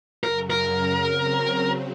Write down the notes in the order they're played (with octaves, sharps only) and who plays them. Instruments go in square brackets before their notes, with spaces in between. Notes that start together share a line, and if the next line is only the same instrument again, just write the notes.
[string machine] F#2 C#3 F#3 [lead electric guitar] A#4
[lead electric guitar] A#4
[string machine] C#3 F#3 C4